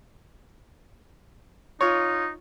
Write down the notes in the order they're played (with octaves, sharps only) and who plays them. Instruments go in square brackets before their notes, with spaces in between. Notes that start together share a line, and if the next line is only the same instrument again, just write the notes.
[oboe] D#4 [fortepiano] F4 C#5